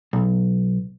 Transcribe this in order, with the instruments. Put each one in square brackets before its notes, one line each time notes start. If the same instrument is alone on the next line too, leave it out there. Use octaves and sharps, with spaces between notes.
[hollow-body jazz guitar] B1